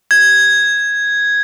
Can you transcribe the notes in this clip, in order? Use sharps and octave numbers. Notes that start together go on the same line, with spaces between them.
G#6